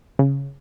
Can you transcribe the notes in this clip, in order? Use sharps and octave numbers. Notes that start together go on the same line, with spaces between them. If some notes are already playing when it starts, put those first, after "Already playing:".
C#3